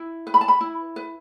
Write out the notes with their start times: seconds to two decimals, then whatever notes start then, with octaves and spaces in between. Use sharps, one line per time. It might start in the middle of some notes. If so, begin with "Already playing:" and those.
Already playing: E4
0.27 B4
0.34 B5
0.41 A5
0.48 B5
0.61 E4
0.96 B4